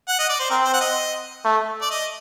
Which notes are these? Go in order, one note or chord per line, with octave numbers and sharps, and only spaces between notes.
F#5
D#5
D5
C5
C4 A#4
C5
F#5
D#5
A3
D5
D#5